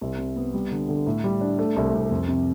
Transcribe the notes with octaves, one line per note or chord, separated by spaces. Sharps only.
C2
C3
B3
G3
D3
D3
A2
G3
D4
A3
C2
C2
F2
C3